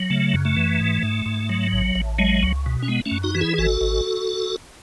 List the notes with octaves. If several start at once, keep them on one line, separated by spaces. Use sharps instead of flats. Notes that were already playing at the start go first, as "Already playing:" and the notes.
Already playing: F#3
C#3 A3
F#2
A3
E3
G#2
G#2
G#2
F#3
A1
A1
F#3 G#3
C#2
B2
C#4
G#3 B3
A3 C#4
F#2
D#4 F#4
E3 F#4
E4 G#4
G#4
G#1 F#4 A4
G#1